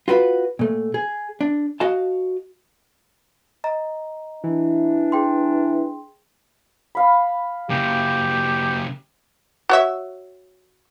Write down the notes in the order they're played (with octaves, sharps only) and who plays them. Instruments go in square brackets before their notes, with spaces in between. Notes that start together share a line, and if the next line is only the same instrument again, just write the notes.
[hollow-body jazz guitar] F4 F#4 A#4 B4
A#2 A3
G#4
D4
F#4 D#5 F5 A5
[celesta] D#5 A#5
[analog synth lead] E3 [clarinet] D4
[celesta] G#4 G5 C6
[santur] F5 B5
[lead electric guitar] C#3 A#3 [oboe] G4
[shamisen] F#4 C#5 E5